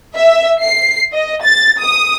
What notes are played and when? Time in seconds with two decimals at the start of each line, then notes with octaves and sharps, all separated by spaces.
0.17 E5
0.62 C7
1.13 D#5
1.43 A6
1.83 D#6